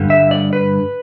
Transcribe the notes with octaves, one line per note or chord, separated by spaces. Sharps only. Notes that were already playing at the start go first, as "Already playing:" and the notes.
Already playing: G2 D3 G3
E5
D5
B4